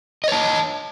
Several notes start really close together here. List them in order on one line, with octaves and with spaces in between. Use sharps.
D#5 C#5 A5